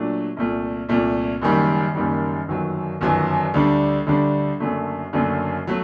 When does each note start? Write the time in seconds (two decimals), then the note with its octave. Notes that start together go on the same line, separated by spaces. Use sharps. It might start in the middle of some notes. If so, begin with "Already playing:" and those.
Already playing: A#2 F#3 A3 D4
0.37 C2 A#2 A3
0.89 C2 A#2 A3
1.42 F#1 F#2 D#3 G3
1.95 F#1 F#2 D#3 G3
2.48 G1 F#2 D#3 F#3
3.01 G1 F#2 D#3 F#3
3.54 D2 D3 G3 D4
4.06 D2 D3 G3 D4
4.60 F#1 F#2 D3 F#3 A3
5.13 F#1 F#2 D3 F#3 A3
5.67 F#3 A3